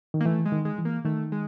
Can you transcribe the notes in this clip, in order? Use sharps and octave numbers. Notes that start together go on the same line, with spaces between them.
D#3
A#3
E3 A3
G#3
D#3
G#3
E3
A#3
D#3 A3
G#3